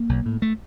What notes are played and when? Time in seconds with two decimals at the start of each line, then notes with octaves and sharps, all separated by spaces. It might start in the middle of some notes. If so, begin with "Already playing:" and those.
Already playing: A#3
0.09 B1
0.26 A2
0.42 A3